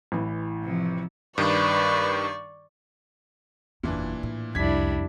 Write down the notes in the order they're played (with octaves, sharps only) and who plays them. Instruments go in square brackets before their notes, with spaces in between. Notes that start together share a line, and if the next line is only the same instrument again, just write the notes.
[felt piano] A1 E3
[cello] C3 F3
[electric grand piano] G2 D#3 [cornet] B4 [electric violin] D5 C#6
[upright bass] F#1 E2 [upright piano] A#2 E3 D4
[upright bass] A2
[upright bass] C2 [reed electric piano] F2 [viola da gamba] G3 D4 E4 [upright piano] G#6 B6